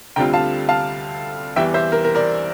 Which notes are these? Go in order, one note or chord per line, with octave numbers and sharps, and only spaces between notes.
D2 D3 G3 C4 F4 G5 A#5
F5 A5
F5 A5
E2 E3 G3 E5 G5
C5 E5
A#4
A#4
A#4 D5